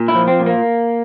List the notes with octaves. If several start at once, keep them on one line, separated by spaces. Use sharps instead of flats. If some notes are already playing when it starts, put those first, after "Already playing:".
Already playing: A#2
E4
F3
C4
A#2
A#3